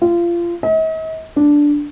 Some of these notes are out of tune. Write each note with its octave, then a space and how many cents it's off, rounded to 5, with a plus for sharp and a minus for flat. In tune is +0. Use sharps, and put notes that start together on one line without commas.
F4 -25
D#5 +45
D4 -5